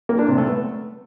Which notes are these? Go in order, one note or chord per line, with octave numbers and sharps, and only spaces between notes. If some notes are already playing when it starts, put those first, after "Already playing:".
A#3
D4
C3
A3
B3